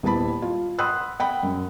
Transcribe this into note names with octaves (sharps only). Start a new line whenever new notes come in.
D#1 B3 E4 A5 B5
F4
F#5 B5 C6 D#6 E6 F#6
F#5 G5 B5
F#2